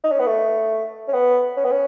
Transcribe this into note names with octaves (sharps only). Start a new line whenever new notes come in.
D#4
C#4
B3
A3
C#4
B3
C#4
B3
C#4